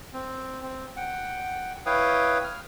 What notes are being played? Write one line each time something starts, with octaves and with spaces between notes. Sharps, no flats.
C4
C4
F#5 G5
E4 B4 C#5 F5 G5 D#6
F6